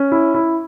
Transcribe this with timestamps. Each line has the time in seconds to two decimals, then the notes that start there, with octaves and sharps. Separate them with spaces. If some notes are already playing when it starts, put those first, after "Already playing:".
Already playing: C#4
0.12 E4
0.34 E4